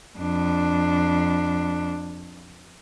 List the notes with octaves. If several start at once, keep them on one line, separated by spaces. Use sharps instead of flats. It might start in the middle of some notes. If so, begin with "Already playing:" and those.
F2 D4